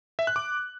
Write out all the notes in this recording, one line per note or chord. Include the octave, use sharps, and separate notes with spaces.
E5
F#6
D6